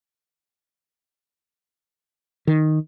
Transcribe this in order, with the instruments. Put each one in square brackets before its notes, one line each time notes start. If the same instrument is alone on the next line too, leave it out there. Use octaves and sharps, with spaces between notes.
[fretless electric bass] D#3